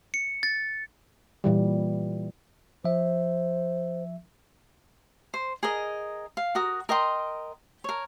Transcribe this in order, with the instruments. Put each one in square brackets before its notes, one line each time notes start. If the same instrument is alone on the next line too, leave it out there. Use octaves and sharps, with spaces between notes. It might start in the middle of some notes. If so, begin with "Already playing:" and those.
[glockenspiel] C#7
A6
[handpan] A#2 E3 G3
[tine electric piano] F3 E5 [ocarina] C5
[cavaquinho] C5
G#4 A#4 D#5
F5
F#4 A#4 D#6
A#4 D#5 G5 C6
A#4 C#5